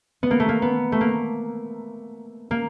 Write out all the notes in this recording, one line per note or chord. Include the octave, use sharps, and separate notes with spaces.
B3
A#3
A3
A#3
B3
A3
A#3
A#3